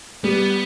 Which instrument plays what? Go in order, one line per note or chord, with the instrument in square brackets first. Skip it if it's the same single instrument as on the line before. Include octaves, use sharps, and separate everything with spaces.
[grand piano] G3 [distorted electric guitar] B3